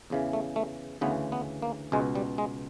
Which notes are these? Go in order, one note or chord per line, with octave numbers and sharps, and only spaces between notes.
E2 C#3 E3
A3
A3
D2 C#3 E3 B3
B3
A#3
C#2 B2 G#3
G3
G#3